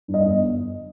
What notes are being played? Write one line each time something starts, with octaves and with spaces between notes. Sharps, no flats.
G2
D#5
G1